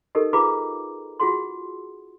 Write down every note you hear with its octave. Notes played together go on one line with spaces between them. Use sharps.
D#4 G4 A4 A#4 D#5
F4 G#4 B4 F5 A#5 D6
F4 F#4 G#4 F#5 C6